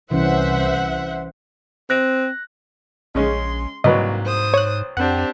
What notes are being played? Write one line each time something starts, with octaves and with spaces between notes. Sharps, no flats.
C2 E3 C#4 C5 E5 F#5
C4 F#6 A#6
A#1 C#3 G#3 C#4 C6
C2 G#2 F#3 A#3 B4 D#5
C5 D#6
C#5 F#6
F2 C4 D4 G4 F#5